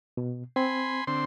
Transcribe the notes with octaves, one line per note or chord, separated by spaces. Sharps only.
B2
C4 G#5 B5 C6
D3 C4 C6